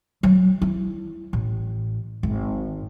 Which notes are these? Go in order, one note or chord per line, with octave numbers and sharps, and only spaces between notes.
F#3
E4
A1
G#1